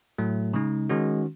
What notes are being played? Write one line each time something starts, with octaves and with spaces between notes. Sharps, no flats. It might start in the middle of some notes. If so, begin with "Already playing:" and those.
A2 F#3 A3
C#3 G#3 D#4
D#3 G#3 C#4 F#4